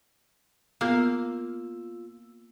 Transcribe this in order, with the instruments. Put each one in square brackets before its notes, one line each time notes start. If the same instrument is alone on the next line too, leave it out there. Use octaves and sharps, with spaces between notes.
[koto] A#3 F5 [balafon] B3 [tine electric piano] F4 E6